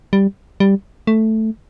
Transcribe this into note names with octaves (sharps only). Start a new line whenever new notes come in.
G3
G3
A3